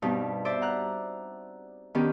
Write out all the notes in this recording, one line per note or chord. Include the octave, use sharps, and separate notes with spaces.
G2 B2 C4 D#4
C5 D5 E5
F#5 A#5 F#6
D#3 B3 C#4 D4 G4